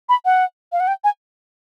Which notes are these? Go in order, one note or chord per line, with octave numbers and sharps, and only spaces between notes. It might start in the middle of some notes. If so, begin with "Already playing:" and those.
B5
F#5
F5
F#5
G5
G#5